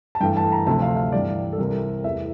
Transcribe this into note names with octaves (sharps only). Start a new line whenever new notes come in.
A5
G2 E3 A3 G5
A5
A#5
D2 C3 F3 A3 A5
F5
F5
G2 E3 G3 D5
A4
C2 C3 G3 A#4
E2 E3 A3 E5